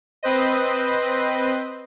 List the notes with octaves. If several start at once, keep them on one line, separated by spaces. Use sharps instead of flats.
C4 B4 C5 D#5